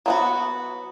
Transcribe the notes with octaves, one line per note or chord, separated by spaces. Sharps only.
F#3 B3 F#4